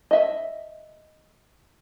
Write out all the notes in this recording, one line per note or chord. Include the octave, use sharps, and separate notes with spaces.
D#5 E5